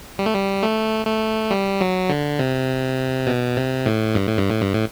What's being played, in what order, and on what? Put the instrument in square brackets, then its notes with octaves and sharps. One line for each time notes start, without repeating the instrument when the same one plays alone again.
[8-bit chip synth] G3
A3
G3
A3
A3
G3
F#3
D3
C3
B2
C3
A2
G2
A2
G2
A2
G2
A2